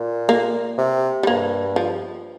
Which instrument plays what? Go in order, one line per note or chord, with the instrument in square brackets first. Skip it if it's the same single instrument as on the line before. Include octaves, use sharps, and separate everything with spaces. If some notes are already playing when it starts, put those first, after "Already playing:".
Already playing: [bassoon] A#2
[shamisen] A#3
[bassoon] C3
[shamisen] G3
[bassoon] G2 [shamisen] A#3
[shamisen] F3